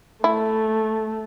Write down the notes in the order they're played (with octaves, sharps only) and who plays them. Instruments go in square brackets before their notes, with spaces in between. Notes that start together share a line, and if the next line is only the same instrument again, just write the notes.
[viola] A3 [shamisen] E4